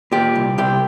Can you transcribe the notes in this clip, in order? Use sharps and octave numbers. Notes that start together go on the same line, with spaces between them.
A#2 G4
C2
C2 G4